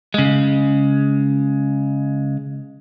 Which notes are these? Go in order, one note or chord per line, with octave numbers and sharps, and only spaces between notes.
C#3 G#3